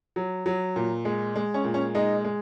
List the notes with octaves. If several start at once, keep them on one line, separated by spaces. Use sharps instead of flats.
F#3
F#3
A#2
G#3
G#3
C#4
A#2
C#4
G#3 D#4
G#3